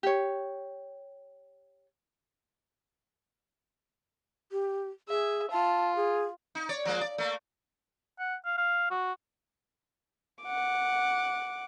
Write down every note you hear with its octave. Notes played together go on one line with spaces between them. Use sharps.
G4 C#5
G4
G#4 E5
F4 A5
G#4
D#4
C#5 D5
F3 G#3 A#3
D5
A3 A#3
F#5
F5
F5
F#4
F#5 D6